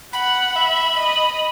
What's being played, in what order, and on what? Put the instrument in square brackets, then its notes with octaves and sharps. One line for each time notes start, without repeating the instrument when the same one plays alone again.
[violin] F#5 [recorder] B5
[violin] E5
D#5